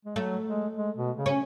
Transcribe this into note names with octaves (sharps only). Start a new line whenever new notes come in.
G#3
F#3 A3
G#3
G#3
B2
C#3
C#4